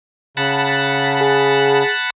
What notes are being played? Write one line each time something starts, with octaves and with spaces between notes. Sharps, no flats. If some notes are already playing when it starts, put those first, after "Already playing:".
C#3 F#5 A5 B5
G#4